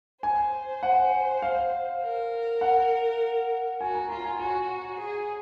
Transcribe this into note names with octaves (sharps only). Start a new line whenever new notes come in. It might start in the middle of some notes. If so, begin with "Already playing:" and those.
C5 G#5
F#5
F5
A#4
F#5
F#4 G#5
A#5
F4 A#5
G#5
F#4 G#5
G#4